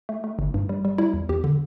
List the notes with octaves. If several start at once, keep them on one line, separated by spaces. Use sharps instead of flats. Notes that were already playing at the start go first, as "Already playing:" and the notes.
A3
A3
G1
G2
G3
G3
G3 E4
E2
E2 G4
D3